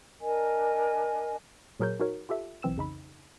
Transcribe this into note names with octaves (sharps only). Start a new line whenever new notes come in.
D4 A#4 D#5 G#5
A#2 F#3 G#4 A#4 C#5 G6
D#4 F#4 A#4 C#5
F4 G4 A4 E5
B1 E3 C4 E6 E7
F2 C#3 D#4 B5